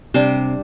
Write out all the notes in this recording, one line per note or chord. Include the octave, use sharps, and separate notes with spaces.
C3 G3 D4 C5